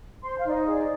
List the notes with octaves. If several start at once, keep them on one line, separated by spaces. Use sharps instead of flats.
C5 C6
F5
D#4 D5
D#5
G#4
D5